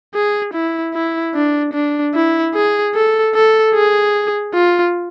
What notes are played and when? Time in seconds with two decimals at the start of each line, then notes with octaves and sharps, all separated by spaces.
0.15 G#4
0.54 E4
0.94 E4
1.34 D4
1.74 D4
2.14 E4
2.54 G#4
2.95 A4
3.35 A4
3.74 G#4
4.54 F4